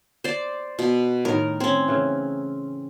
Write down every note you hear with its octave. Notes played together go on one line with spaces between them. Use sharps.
C5 D5
B2
A2 D#3 A#4
C4 C#4
C#3 E3